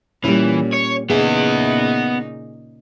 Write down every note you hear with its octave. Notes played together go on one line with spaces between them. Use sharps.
A#2 E3 G3 C#4
C#5
A#2 C#3 B3 D#4 G#4 E5